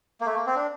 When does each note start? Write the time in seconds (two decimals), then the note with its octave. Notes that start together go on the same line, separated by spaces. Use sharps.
0.21 A#3
0.26 A3
0.36 A#3
0.46 C4
0.56 D4